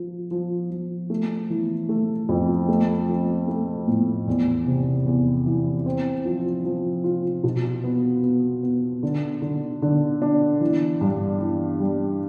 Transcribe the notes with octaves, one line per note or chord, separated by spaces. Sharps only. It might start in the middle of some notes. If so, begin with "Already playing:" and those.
Already playing: F3
F3
F3
A3
E3
A3
F2
A3
F3
A3
A2
E2
C3
E2
E3
C4
F3
F3
F4
B2
B3
B3
B3
D3
D3
D3
D4
E3
G2
E3
G3